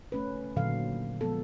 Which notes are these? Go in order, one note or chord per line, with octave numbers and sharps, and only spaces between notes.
A3 C#4 B4
A#2 D3 D#3 F#3 A4 F5
F3 G#3 B3 A4